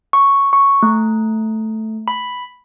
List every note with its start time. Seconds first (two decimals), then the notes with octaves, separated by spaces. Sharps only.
0.13 C#6
0.53 C#6
0.83 A3
2.08 B5